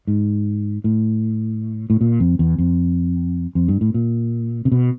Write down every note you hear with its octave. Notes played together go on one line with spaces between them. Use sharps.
G#2
A2
A2
A#2
F2
E2
F2
F2
G2
A2
A#2
C3
B2